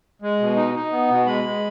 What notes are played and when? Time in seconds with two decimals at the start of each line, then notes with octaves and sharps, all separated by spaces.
0.22 G#3
0.39 B2
0.56 D#4
0.74 D#4
0.92 B3
1.09 B2
1.26 G#3 B5
1.44 G#3